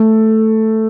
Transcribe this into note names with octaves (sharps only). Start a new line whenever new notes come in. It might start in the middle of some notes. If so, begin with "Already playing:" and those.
Already playing: A3